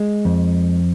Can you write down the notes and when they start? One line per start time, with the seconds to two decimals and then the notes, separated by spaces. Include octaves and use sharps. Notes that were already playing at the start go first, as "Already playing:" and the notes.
Already playing: G#3
0.25 F2